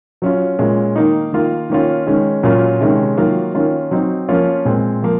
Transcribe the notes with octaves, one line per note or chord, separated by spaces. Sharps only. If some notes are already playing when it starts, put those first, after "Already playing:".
F#3 C#4 F4
A#2 G#3 C#4 F4
D#3 A#3 D#4
D#3 A#3 F4
D#3 A#3 C#4 F4
D#3 G#3 C#4
A#2 F#3 C#4 F4
C3 D#3 G#3 C#4
D#3 F#3 A#3 F4
D#3 A#3 C#4 F4
F#3 C4 D#4
F3 A#3 C#4 F4
A#2 G#3 C4
F3 A#3